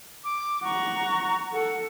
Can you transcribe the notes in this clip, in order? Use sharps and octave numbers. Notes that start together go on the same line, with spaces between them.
D6
F#5 A#5 C#6
A4 F#5